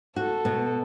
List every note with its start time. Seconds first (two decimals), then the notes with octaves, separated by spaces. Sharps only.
0.16 F#4 A4
0.45 B2